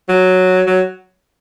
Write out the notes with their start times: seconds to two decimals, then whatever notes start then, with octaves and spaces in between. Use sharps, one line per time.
0.09 F#3
0.67 F#3